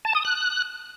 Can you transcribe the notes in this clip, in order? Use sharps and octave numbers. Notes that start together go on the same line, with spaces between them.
A5
D#6
F#6